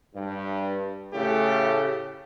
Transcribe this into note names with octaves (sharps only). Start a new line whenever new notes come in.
G2
A2 C#3 A3 G4